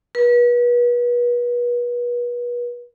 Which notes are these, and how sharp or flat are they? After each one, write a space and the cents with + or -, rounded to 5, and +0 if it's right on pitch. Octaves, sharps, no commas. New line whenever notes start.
B4 -35